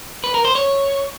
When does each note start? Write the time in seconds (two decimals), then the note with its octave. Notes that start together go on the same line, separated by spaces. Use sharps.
0.24 B4
0.34 A#4
0.45 C5
0.55 C#5